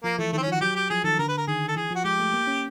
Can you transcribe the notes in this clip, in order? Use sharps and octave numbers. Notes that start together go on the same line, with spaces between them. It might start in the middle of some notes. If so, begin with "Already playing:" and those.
F3 A#3
E3 A3
D#3 A3 C4
C#4
F3 F#4
F#3 G4
G4
F3 G#4
D#3 A4
D3 A#4
B4
A#4
D#3 G#4
A4
E3 G#4
F3 F#4
G#3 G4
A3
A#3
C#4